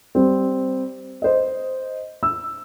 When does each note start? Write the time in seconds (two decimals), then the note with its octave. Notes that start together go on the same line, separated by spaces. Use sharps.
0.15 G3 C4
1.22 C5 D#5
2.23 E6